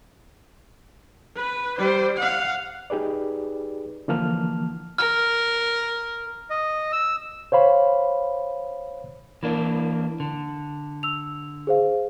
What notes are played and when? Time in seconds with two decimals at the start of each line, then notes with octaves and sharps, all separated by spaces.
1.36 B4
1.78 G3 C5
2.17 F5 F#5
2.90 D#4 G4 G#4 B4 D5
4.08 D3 E3 F3 A#3 A5 F6
4.98 A#4 F6
6.50 D#5
6.92 E6
7.52 C5 C#5 F5 B5
9.43 E3 A#3 D4
10.20 D3
11.03 E6 F7
11.67 G#4 C5 F5